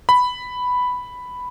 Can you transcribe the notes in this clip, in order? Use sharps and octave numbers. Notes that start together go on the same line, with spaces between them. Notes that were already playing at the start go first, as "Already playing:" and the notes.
B5